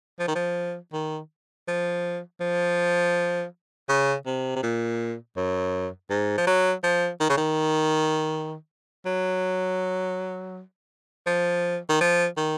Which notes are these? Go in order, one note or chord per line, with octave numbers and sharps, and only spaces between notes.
F3
D#3
F3
D#3
F3
F3
C#3
C3
C3
A#2
F#2
G#2
F3
F#3
F3
D#3
C#3
D#3
F#3
F3
D#3
F3
D#3